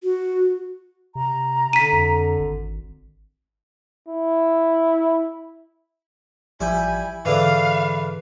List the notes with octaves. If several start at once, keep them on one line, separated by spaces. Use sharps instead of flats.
F#4
C3 A#5
D3 B6 D#7
F2
G#1
E4
A1 F3 G3 E4 G#5 G6
G#2 D3 E3 G#4 B4 F5